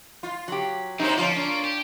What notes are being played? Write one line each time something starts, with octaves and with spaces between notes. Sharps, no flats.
F4
F#3 G4
F#2 C3 C4 D#4 E4 C5
F3 A#3 C#4 F4
D4
G4